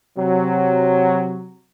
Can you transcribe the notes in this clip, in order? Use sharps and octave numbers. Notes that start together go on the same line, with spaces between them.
C3 F#3